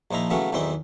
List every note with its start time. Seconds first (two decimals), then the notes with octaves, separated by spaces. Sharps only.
0.11 A#1 F3 D#4 E4 A#5
0.30 C#3 E3 F#3 A3 B3 C#4
0.53 B1 E2 D#3 E3 C4 G5